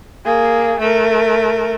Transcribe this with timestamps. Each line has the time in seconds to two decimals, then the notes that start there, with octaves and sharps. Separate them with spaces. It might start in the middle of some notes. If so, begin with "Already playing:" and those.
0.25 A#3 G#4
0.80 A3 A#4